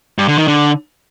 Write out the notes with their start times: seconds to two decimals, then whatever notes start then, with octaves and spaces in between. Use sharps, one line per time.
0.18 G2
0.28 D3
0.38 D#3
0.48 D3